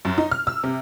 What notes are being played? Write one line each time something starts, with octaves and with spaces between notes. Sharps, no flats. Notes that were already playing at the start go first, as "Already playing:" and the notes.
F#2
D#4
F6
E6
C3